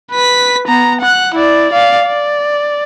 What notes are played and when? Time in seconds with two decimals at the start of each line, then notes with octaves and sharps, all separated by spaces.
0.12 B4 B6
0.68 B3 A#5
1.01 F#5 F#6
1.35 E4 D5
1.72 D5 F5
2.06 D5